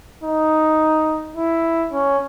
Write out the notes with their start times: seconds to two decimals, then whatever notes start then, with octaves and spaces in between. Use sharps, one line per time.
0.24 D#4
1.36 E4
1.93 C#4